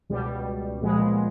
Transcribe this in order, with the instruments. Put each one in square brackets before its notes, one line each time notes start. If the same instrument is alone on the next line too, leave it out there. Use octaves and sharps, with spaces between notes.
[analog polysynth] C#2 B2 G3
A#2 F3 G#3 B3